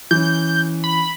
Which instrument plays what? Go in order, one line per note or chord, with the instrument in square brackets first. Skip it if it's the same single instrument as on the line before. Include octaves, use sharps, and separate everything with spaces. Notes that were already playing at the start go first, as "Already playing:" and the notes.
[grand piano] E3 C#4 [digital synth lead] G6
[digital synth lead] B5